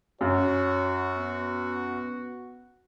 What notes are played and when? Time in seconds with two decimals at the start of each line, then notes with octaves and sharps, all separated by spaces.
0.21 F#2 F#4 C#5
1.18 B3